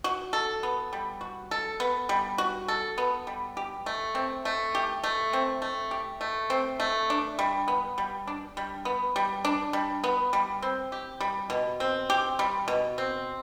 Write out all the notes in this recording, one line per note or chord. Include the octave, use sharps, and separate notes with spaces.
F#4
A4
B3
G3
F#4
A4
B3
G3
F#4
A4
B3
G3
G4
A3
C4
A3
G4
A3
C4
A3
G4
A3
C4
A3
D4
G3
B3
G3
D4
G3
B3
G3
D4
G3
B3
G3
C4
G4
G3
B2
C4
G4
G3
B2
C4